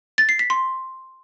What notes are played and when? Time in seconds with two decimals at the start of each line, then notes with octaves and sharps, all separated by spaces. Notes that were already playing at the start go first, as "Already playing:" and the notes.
0.18 A6
0.29 C7
0.39 B6
0.50 C6